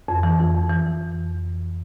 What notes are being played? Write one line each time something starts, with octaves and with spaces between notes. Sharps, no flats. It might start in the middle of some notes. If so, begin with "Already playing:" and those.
F2
E3
F2
F2
E3